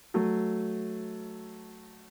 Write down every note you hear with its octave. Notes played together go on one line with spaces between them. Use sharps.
F#3 A3